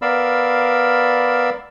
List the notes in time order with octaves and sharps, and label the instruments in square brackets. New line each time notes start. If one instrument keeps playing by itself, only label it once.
[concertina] B3 A#4 D5 F5 B5 E6